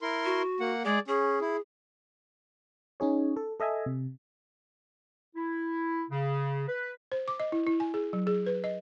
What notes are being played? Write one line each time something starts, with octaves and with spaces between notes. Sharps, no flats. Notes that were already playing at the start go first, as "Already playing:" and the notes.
E4 A#4 C6
F#4
A#3 F#5
G#3 G#4 D5
C#4 G#4
E4
C#4 D#4 G#4 C#5
A4
A4 D#5 E5 G#5
C3
E4
C#3
B4
C5
D6
D#5
E4
E4
G#5
G#4
F#3
G#4
B4
D#5